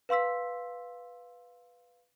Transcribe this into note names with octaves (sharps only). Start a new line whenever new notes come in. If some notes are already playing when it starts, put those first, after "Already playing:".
B4 F5 C6 E6 B6